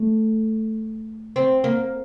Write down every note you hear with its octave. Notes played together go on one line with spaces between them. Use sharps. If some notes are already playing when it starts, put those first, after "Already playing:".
Already playing: A3
C4
A#3